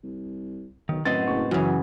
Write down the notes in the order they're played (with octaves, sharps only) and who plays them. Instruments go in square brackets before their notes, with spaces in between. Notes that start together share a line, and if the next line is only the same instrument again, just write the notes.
[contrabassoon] C2
[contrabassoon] B1 [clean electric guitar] D#3
[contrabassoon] F#2 [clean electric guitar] A2 C4 D#5 [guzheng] B3 [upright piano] A6
[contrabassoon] F#1 [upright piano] C#6
[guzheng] F#2 C#3 [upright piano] E3 [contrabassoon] F#3